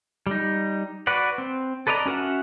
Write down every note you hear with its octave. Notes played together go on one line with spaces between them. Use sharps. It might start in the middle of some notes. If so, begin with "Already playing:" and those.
G3 D#4
F#4 B4 D5 F#5
C4
A4 B4 D5 D#5 A#5
C#4 F#4 A#4 E5 F#5